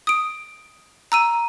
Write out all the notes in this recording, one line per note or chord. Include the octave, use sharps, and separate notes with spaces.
D#6 D7
A#5 E6 D#7